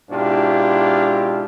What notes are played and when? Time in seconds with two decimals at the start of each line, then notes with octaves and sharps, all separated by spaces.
0.10 G#2 B2 D4 E4 F4 G4